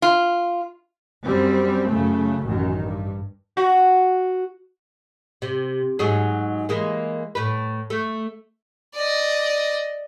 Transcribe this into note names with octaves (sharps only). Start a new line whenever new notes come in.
F4
F#2 G3 C4
F#2 C#3 A3
A1 F#2 D#3
G2
F#4
C3
G#2 F#3 G#4
E3 G#3 A#3
A2 B4
A3
D5 D#5